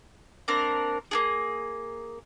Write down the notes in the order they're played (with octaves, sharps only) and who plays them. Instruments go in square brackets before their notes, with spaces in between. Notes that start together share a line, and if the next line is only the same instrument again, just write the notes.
[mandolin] A#3 C4 D4 A#4
A#3 D4 G#4